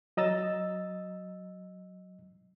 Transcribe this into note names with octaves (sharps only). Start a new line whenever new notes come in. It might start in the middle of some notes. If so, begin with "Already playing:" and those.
F#3 D#5 A#5 E6 A6